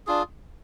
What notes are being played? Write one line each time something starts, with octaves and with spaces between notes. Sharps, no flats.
D4 F4 G#4